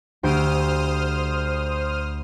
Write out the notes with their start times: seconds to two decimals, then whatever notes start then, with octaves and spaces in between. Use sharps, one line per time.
0.23 D2 G4 C5 D#6 F6 D7